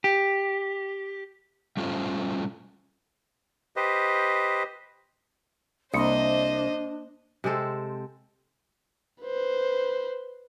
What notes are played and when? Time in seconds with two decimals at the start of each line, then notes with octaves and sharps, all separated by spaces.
0.04 G4
1.77 G3 A3 C#4 F4 A4 C5
3.76 G4 B4 C5 D#5
5.94 C2 A#3 D4 C5 D#5 D#6
7.44 C3 G#3 C4 A4
9.22 B4 C5